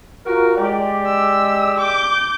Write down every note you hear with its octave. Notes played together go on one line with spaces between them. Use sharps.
F4 F#4 A#4
G#3 G4 D5
E6
D6 G6